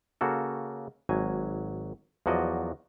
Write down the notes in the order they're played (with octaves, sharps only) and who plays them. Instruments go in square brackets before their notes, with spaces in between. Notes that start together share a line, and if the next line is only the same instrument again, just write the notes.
[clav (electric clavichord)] C#3 A#3 F#4 A4
G#1 F#3 G#5
E2 F3 F#3 F#4 D5 D#5